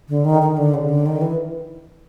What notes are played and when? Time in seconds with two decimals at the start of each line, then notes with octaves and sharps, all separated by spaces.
0.09 D3
0.25 D#3
0.42 D#3
0.57 D3
0.74 C#3
0.89 D3
1.06 D#3
1.21 E3